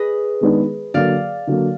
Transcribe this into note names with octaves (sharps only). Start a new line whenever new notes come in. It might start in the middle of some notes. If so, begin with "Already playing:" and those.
Already playing: G#4 B4 D#5
D#3 G#3 B3 D4
D3 F#3 A#3 D5 F5
D3 F#3 A#3